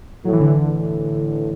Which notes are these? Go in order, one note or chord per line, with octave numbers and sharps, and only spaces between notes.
A2 F#3
E3
D3
E3
A2